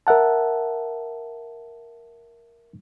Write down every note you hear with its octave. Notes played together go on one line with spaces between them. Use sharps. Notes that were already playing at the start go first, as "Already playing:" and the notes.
A#4 E5 F#5 A5